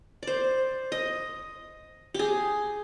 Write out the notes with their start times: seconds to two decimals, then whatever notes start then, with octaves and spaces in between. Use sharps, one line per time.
0.23 C5 D5
0.92 D#5
2.14 G4 G#4